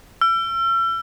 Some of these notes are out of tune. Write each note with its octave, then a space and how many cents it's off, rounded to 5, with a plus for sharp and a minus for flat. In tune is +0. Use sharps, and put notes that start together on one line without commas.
E6 +40